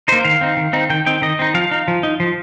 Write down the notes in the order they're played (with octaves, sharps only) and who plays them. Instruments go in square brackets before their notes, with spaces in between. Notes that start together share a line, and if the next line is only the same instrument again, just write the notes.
[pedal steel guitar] A#3 D#4 C5
D#3 F5
C4 D#4
D#3
C4 D#4
D#3 G5
C4 D#4 G5
D#3 D#5
C4 D#4
F3 F5
D#4
F3
D#4
F3